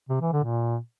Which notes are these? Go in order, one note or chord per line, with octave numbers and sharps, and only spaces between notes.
C3
E3
D3
A#2